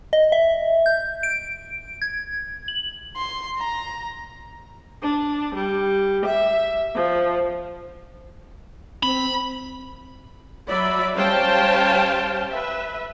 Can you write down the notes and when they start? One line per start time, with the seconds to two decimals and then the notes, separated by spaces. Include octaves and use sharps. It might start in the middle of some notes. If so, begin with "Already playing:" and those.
0.13 D#5
0.32 E5
0.86 G6
1.23 D7
2.02 G#6
2.68 F#7
3.16 C6
3.58 A#5
5.02 D4
5.55 G3
6.25 E5
6.95 F3
9.03 C4 B5
10.66 F#3 D5 E5 B5
11.13 G3 C#4 C5 F5 G5 A5
12.50 B4 E5